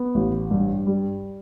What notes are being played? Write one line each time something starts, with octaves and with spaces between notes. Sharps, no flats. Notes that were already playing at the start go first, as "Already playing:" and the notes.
Already playing: B3
A1
G2
G3